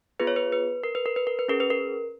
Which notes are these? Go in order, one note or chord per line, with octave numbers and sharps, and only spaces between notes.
B3 F4 G#4 B4
C#5
B4
B4
A#4
B4
A#4
B4
A#4
B4
C#4 G#4 A#4
B4
A#4